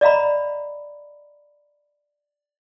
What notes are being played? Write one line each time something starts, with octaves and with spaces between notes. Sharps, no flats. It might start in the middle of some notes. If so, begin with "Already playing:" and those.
D5 D#5 F5 A#5 B5